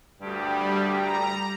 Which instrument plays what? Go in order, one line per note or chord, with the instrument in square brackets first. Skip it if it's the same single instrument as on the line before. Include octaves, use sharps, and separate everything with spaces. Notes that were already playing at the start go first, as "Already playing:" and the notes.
[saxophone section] D2 G2 G4 [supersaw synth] G3
[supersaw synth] A#5